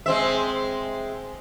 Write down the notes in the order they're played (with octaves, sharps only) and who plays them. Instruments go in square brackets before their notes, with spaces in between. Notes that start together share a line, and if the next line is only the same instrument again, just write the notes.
[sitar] G#3 C4 E5